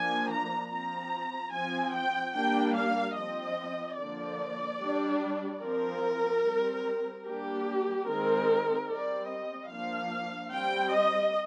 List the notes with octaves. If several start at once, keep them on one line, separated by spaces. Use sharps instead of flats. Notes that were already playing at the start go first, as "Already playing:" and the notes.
Already playing: F3 A#3 D4 G#5
A#5
F3 C4 A#5
F3 C4 G#5
G5
G3 A#3 D4 G5
F5
F3 C4 D#5
D3 F3 A#3 D5
G3 D4
F3 C4 A#4
G3 C4
G3 A#3 D4 G4
D#3 G#3 C4 A#4
G3 C4 D5
D#5
F3 A#3 D4 F5
G3 C4 G5
D#5